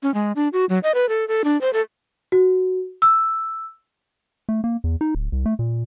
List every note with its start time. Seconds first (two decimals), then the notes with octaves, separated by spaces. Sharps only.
0.03 C#4
0.14 G#3
0.36 D4
0.53 F#4
0.69 F#3
0.83 D#5
0.95 B4
1.09 A4
1.28 A4
1.44 D4
1.61 C5
1.73 A4
2.32 F#4
3.02 E6
4.49 A3
4.64 A#3
4.84 E2
5.01 D#4
5.15 D1
5.32 C2
5.46 A3
5.59 A#2